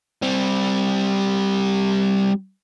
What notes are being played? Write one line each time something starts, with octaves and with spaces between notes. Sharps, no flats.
G3 C4